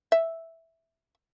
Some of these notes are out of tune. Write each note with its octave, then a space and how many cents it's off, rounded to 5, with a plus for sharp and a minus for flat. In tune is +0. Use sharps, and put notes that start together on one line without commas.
E5 -5